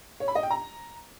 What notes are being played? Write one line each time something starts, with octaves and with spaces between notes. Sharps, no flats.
C#5
B5
D#5
G5
A#5